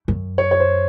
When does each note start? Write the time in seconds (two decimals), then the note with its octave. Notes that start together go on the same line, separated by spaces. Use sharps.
0.08 F#2
0.38 C#5
0.51 C#5
0.60 C5